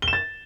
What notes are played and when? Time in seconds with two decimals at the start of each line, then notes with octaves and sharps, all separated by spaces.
0.02 G7
0.08 E7
0.13 A6